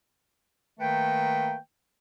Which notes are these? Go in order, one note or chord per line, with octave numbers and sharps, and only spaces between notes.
D#3 A3 A#3 B4 G5